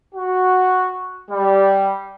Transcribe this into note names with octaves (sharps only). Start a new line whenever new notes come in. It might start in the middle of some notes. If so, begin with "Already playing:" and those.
F#4
G3